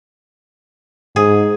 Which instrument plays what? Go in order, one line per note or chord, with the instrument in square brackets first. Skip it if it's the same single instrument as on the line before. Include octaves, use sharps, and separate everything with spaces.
[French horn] G#2 [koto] G#4